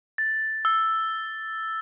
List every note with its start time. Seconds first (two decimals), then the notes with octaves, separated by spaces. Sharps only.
0.18 A6
0.65 E6